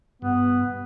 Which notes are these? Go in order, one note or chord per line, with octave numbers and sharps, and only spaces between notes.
G2 B3